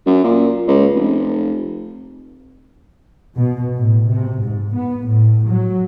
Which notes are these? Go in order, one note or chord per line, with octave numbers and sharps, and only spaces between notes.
F#2
A#2
C#2
F1
B2
A2
C3
G#2
B3
A2
F#3